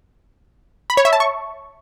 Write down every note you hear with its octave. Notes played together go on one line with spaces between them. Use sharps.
B5
C#5
E5
A5
C#6